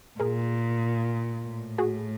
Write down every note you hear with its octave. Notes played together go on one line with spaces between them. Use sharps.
A#2 G#4 A#4
A2
F#4 G#4